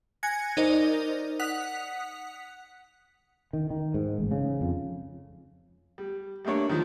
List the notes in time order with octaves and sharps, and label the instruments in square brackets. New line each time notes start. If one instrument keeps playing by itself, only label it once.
[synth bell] G#5 F#6 G#6 A#6 C#7
D#4 A#4 C5 D5 D#5
F#5 D#6 F#6 B6 F7
[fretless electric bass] D#3
D#3
G#2
A1
C#3
F2
[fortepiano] G3
G3 A3 A#3 D4 C#5
D#3 F3